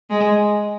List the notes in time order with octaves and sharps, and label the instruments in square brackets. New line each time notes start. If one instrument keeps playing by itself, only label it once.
[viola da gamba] G#3